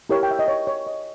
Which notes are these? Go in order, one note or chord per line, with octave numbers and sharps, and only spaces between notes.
E4 G4 A#4 C#5
G5
E5
D#5
C#5
C#5
D#5